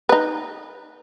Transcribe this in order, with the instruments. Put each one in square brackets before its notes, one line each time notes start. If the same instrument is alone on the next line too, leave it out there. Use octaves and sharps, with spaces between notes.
[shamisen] D#4 B4